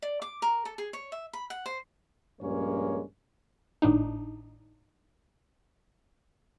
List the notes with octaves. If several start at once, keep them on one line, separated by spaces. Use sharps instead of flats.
D5
D6
A#4
A4
G#4
C#5
E5
B5
F#5
C5
A#1 G2 G#3 A#3 C#4 C#5
G#1 A2 D4 D#4